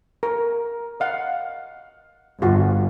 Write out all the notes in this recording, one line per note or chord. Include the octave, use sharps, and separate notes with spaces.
A#4
D#5 F5 F#5
G1 F4 F#4